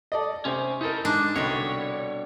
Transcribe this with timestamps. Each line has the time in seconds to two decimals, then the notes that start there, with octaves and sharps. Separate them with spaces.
0.12 A4 D5 D#5
0.45 C3 C4 C#4
0.81 D#4 E4 A4 A#4
1.05 G#2 G#3 D4
1.36 C2 B2 D3 G3 C#5